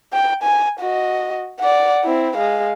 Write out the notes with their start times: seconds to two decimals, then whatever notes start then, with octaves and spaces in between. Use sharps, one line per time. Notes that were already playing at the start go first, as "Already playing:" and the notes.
0.14 G5
0.43 G#5
0.80 F#4 D#5
1.60 D5 F#5
2.04 C4 E4
2.36 G#3 F5